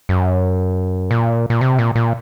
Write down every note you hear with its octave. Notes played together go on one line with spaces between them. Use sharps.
F#2
A#2
A#2
C3
A#2
A#2